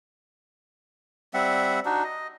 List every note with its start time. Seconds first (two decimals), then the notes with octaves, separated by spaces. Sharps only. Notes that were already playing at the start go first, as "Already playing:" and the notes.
1.34 G3 C4 E5 F#5
1.85 D4 D#4 F#4
2.04 D#5